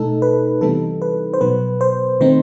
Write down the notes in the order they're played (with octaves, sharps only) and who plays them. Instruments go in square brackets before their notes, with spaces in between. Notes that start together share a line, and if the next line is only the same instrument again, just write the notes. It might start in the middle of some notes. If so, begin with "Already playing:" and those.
Already playing: [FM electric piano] B2 A3 D#4 A4
B4
C3 E3 G3 B3 D#4 A4
B4
C5
B2 F#3 B3 B4
C5
D#3 A3 C4 D#4 C5